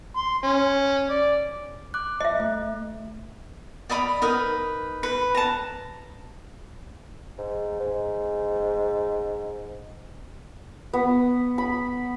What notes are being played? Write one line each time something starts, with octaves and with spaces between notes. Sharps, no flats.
C6
C#4
D5
D6 F#6
D#5 E5
A3
D5 D#5 A#5 B5
D#4 A#4 B4 D#6
B4
A5 A#5
G#2
G#2
B3
B5